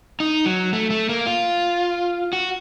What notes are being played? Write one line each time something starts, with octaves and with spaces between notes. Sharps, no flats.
D#4
F#3
A3
A3
A#3
F4
F#4